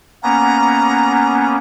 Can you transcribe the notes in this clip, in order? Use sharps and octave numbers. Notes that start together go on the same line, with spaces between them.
A#3 B3 C#4 A#5